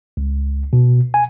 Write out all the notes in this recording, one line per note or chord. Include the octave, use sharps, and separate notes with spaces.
C#2
B2
G#5